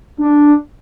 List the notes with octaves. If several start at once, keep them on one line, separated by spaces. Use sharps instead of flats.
D4